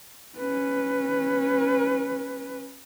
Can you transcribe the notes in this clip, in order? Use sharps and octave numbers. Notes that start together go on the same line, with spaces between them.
C#4 B4